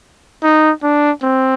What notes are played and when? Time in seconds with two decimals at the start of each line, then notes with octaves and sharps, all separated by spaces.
0.43 D#4
0.83 D4
1.23 C4